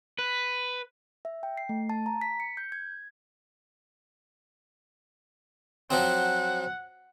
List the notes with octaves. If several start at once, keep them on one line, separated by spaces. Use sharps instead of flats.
B4
E5
G5
C7
A3
A5
A#5
B6
C#7
G6
G#6
F3 F#3 C4 F#5